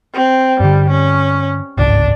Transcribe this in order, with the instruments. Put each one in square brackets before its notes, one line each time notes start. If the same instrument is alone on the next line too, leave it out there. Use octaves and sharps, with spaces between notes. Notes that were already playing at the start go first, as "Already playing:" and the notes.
[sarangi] C4
[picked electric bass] G2 D3 [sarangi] G3
[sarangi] C#4
[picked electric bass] G1 C#2 G#2 [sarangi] D4